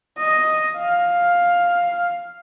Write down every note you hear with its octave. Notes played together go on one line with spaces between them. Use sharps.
D#5
F5